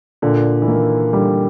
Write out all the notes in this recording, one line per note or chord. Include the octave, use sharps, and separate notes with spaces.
A#2 D3
E3
D#3 A#3
D3 G3